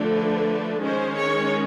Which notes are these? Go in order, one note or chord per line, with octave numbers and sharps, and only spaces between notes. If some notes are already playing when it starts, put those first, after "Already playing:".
Already playing: D3 F3 A3 D4
B4
D#3 G#3 C#4 C5
C#5